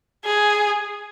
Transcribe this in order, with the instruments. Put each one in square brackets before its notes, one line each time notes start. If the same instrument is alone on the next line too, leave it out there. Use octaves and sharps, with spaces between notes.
[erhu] G#4